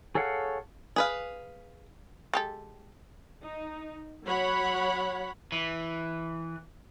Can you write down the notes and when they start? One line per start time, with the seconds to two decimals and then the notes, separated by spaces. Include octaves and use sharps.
0.15 G#4 A4 C#5 F5 F#5
0.96 G#4 B4 F5
2.34 G#3 G4 A4
3.42 D#4
4.24 F#3 C#5 F#5 B5
5.52 E3